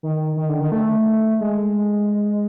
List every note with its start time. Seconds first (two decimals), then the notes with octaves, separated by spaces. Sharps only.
0.03 D#3
0.37 D#3
0.49 D3
0.60 D#3
0.72 A3
1.40 G#3